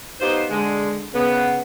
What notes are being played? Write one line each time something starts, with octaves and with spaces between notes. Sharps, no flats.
B3 D#4 F4 G4 C5
D3 G#3
C#3 B3